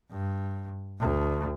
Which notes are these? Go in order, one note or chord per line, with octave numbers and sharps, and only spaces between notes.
G2
D2